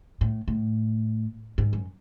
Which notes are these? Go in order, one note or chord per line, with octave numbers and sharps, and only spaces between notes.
A2
A2
G#2
F#2